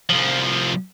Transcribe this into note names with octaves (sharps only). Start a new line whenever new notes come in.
C2 F3